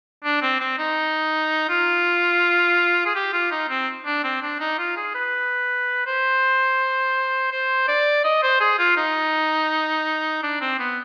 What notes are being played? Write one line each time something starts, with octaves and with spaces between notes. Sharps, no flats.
D4
C4
C4
D#4
F4
G#4
G4
F4
D#4
C4
D4
C4
D4
D#4
F4
G#4
B4
C5
C5
D5
D#5
C5
G#4
F4
D#4
D4
C4
B3